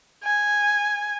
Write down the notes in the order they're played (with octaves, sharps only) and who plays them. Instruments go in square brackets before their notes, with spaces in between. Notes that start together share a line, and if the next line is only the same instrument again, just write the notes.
[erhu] G#5